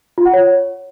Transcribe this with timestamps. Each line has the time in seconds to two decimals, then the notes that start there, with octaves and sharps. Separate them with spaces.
0.18 F4
0.26 F#5
0.33 C#5